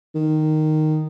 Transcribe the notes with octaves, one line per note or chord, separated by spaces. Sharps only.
D#3